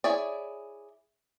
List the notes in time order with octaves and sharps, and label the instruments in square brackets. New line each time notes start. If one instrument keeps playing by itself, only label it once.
[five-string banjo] E4 G#4 C#5 D5